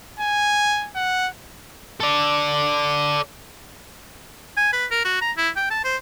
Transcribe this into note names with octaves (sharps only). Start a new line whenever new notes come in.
G#5
F#5
A4 D5
G#5
B4
A#4
F#4
A#5
E4
G5
A5
C5